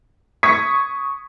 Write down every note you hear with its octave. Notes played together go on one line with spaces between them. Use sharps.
C#6 D#6 G#6 B6 C#7